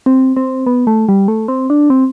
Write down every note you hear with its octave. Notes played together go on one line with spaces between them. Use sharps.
C4
C4
B3
A3
G3
A3
C4
D4
C4